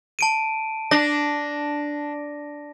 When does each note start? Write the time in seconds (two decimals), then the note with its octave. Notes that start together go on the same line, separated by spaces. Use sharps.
0.19 A5 D7 D#7
0.91 D4 A#6